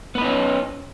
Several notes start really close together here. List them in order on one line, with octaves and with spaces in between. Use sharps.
B3 B4 D#4 C#4